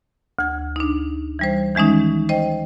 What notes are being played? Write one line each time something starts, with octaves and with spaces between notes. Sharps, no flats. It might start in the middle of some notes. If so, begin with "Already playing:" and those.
D2 G#6
D4 D#4
E3 G3 C5
D#3 E3 G#3 C#4 D#4
C5 D#5 G5